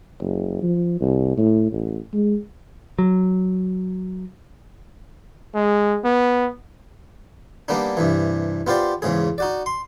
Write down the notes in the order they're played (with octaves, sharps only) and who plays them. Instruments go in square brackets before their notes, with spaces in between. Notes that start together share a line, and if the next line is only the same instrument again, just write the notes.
[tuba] F#1
F3
C2
A2
A1
G#3
[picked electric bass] F#3
[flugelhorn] G#3
B3
[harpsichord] G3 A#3 B3 D4 D#4
G2 C3 E3
B3 F4 G4 C5 D5
E2 G#2 C#3 G#4
D#4 F#4 D5
C6